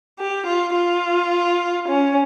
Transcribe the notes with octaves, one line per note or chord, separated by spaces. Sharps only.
G4
F4
F4
C#4